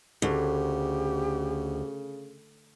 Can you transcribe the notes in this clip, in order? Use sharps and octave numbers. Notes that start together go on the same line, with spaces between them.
D2 C#3 G4